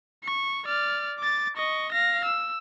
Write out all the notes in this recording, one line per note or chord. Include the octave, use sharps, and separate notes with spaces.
C#6
D5 F6
D6 A6
D#5 C#6
F5 A#6
E6